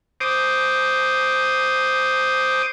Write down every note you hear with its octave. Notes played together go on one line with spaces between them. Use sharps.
C5 D6 D#6